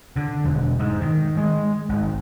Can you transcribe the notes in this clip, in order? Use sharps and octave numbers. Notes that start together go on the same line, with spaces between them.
D3
E1
G#2
D#3
G#3
G#1